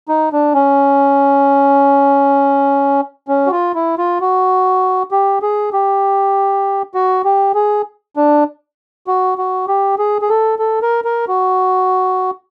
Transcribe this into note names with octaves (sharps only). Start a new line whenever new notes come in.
D#4
D4
C#4
C#4
F#4
F4
E4
F4
F#4
G4
G#4
G4
F#4
G4
G#4
D4
F#4
F#4
G4
G#4
G#4
A4
A4
A#4
A#4
F#4